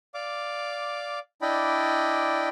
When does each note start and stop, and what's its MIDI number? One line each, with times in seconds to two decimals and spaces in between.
0.14 1.19 74
0.14 1.19 77
0.14 1.19 86
1.42 2.49 62
1.42 2.49 64
1.42 2.49 74
1.42 2.49 75
1.42 2.49 79
1.42 2.49 83